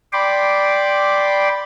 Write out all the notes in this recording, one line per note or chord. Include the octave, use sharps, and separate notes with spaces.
D5 G5 B5 C6 D6